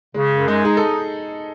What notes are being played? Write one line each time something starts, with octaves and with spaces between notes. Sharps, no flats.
C#3 G#3
F#2
G#3 D#4
D#4 G#4
A4